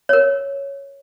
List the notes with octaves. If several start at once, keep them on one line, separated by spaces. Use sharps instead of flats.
A#4 C#5